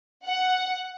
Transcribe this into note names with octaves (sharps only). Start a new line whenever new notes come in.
F#5